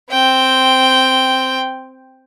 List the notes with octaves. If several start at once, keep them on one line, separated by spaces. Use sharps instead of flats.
C4 G5